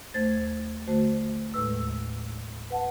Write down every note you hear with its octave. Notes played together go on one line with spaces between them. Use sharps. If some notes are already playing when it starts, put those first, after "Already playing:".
D#2 A3 C5 G#6 A6
D3 A3 F#4 C5
D#2 A2 G#3 B4 E6
B4 F#5 A5